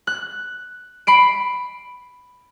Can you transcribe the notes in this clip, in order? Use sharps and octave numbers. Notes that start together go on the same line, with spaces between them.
F#6
B5 C7 D7